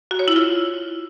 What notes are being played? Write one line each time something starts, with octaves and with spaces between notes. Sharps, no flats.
F#4
C#5
E4
F4